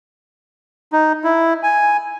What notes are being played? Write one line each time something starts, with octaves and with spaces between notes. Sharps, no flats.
D#4
E4
G#5